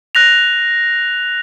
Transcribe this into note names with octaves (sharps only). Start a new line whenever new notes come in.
F#6 A#6 F7